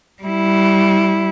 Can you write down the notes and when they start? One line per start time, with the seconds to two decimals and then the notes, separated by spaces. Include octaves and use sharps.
0.23 G3 E4